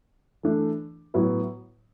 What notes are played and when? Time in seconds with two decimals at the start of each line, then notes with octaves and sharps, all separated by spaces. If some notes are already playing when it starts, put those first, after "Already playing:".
0.43 E3 A3 D4
1.14 A2 F#3 B3 E4